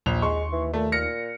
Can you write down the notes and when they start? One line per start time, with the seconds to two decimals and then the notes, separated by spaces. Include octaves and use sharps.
0.06 A#1 D#2 F7
0.22 G#3 C6 C#6
0.53 E3
0.73 A#2 A3
0.92 A#2 F6 A#6 C#7